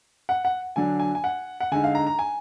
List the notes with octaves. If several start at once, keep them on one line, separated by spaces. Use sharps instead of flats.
F#5
F#5
D3 F#3 D4 G#5
G#5
G#5
F#5
F#5
D3 G#3 D#4 G#5
F5
A#5
A#5
G#5